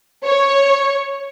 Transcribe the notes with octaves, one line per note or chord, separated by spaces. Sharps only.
C#5